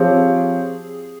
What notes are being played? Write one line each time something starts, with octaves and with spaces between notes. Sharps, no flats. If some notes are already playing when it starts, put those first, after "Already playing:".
Already playing: F3 C4 G4 G#4 C#5